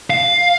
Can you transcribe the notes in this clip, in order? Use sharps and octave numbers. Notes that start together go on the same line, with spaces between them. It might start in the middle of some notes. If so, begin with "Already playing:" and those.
F5